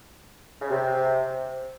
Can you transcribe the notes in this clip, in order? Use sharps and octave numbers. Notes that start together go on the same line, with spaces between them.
C#3
C3